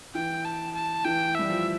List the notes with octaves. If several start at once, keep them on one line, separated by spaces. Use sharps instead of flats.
E3 G5
A5
A5
E3 G5
G3 E5
F3